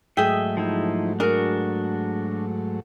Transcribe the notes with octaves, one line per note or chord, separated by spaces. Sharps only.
G#2 F#3 A3 G#4 D#5 E5 G5
F3 D#4 E4
D4 F#4 G#4 A#4